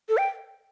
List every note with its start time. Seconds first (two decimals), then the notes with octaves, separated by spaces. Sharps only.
0.09 A4
0.18 G5